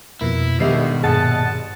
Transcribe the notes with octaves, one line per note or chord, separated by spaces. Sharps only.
F2 B2 A#3 E4
G#1 B2 D3 D#3 G3 E5 C7
G2 A#2 G#4 D#5 F#5 A5